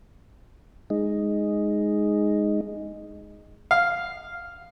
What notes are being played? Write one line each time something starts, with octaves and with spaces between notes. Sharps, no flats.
G#3 D#4
F5